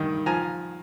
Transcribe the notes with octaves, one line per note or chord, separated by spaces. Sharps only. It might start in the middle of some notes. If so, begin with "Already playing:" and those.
Already playing: G2 D#3
F3 G#5 A#5